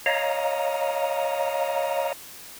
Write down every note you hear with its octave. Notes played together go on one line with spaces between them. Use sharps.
C#5 D#5 F5 A#5